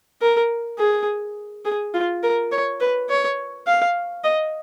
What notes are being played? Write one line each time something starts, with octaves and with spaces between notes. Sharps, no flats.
A#4
G#4
G#4
F4
A#4
C#5
B4
C#5
F5
D#5